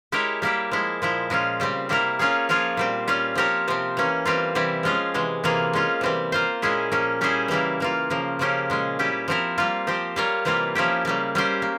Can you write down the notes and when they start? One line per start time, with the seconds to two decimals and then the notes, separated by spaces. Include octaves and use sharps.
0.12 G#3 E4 G4 A#4 C#5
0.42 G3 A#3 E4 G4
0.71 F3 G#3 E4
1.02 A#2 F3 G#3 E4
1.30 A#2 G#3 C#4 F4
1.60 C#3 G3 C4
1.89 C3 G3 A#3 E4 A#4
2.19 A#3 C#4 F4 G#4 C#5
2.49 F3 A#3 F4 G#4 C#5
2.77 A#2 G3 C4
3.08 G3 C#4 F4
3.35 F3 C4 G4 A#4 C#5
3.68 C3 F3 C4
3.97 E3 A#3 C#4
4.25 E3 G3 C4 F4
4.55 C3 E3 G3 C4 E4
4.83 F3 G#3 C#4 F4
5.14 C3 E3 G#3
5.44 C3 E3 A#3 F4 G#4
5.73 G#3 C#4 F4
6.01 C3 E3 G3 C4
6.32 A#3 F4 C5
6.62 A#2 G#3 C#4 E4 G#4
6.92 A#2 F3 A#3 C#4
7.21 G3 C#4 E4 G#4 C5
7.48 C#3 E3 G3 A#3 E4
7.80 E3 A#3 F4
8.10 C#3 F3 A#3
8.39 C#3 F3 A#3 C#4 G4
8.70 A#2 G#3 C#4
8.99 G3 C#4 E4 G4
9.28 F3 C4 E4 A#4
9.58 G3 A#3 F4
9.87 F3 C4 G4 C5
10.16 G3 A#3 F4 A#4 C#5
10.45 C3 E3 G3 A#3 F4
10.75 F3 A#3 C#4 E4 G4
11.05 C#3 G3 A#3
11.35 G3 A#3 C#4 G4 C5
11.62 A#3